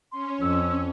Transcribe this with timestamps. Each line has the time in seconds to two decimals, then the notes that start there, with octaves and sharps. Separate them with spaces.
0.12 C#4 C6
0.41 F2 E6